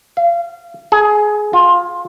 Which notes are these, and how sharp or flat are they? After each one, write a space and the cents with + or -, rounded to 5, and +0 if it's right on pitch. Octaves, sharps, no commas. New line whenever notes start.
F5 -30
G#4 +15
F4 +15